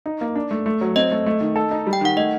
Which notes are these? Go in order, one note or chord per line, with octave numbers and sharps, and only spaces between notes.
D#4
A#3
D4
A3
A3
F#3
C4 D#5
A3
A3
D#3
A4
D#4
G3
G5
D#3 F#5
A3 D#5